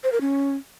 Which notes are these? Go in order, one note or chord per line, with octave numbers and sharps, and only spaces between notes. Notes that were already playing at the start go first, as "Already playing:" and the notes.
C5
A#4
C#4